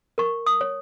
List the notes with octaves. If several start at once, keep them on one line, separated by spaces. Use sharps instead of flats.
A#4 C#6
D#6
C#5